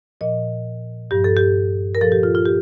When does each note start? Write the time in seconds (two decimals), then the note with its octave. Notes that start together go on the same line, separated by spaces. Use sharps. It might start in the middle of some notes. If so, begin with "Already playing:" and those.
0.21 A#2 F3 D#5
1.11 G2 F3 G4
1.24 A4
1.37 G4
1.95 A#4
2.01 A#2 F3 A4
2.12 G4
2.23 F4
2.35 F4
2.46 G4